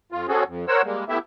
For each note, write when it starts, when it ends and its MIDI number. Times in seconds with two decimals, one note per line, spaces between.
0.12 0.27 41
0.12 0.27 65
0.28 0.44 60
0.28 0.44 61
0.28 0.44 66
0.28 0.44 68
0.28 0.44 69
0.47 0.65 41
0.68 0.82 70
0.68 0.82 72
0.68 0.82 73
0.68 0.82 78
0.68 0.82 88
0.85 1.04 55
0.85 1.04 56
0.85 1.04 58
1.09 1.18 57
1.09 1.18 59
1.09 1.18 64
1.09 1.18 67
1.09 1.18 76